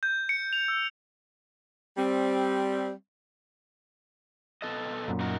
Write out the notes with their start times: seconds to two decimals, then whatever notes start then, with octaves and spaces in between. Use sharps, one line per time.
0.03 G6
0.29 C#7
0.53 F7
0.68 E6
1.97 G3 C4
4.62 B2 A4 D#5
5.08 F#2 A#2
5.20 D#4 F#4 A#4